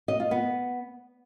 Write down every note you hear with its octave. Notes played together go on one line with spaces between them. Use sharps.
D#5
F4
B3